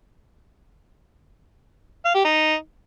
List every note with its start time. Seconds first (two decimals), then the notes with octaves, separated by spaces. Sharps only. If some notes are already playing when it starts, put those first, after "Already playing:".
2.05 F5
2.15 G4
2.25 D#4